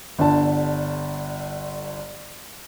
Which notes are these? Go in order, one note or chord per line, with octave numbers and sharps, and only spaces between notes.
G1 D3 A5